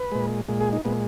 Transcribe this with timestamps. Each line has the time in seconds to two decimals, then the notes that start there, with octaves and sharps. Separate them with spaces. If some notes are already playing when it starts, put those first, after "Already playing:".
Already playing: B4
0.12 A#2 G#3
0.48 A#2 G#3
0.61 G#4
0.73 D#4
0.85 A#2 G#3 B3